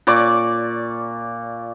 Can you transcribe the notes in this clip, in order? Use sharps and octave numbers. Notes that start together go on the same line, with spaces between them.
A#2 D5 C#6 D6